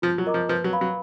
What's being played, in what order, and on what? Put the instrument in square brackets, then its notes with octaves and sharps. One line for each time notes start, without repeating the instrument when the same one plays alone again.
[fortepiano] F3 [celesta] F4
[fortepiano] F#3
[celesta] A#4 D#5 A#5 D6
[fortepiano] F3
[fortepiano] F3 [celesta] B4
[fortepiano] F#3
[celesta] F5 B5
[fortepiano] F#3